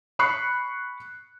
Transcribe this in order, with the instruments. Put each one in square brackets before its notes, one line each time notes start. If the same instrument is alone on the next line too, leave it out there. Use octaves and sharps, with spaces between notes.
[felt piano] B5 C#6 F#6 C7 C#7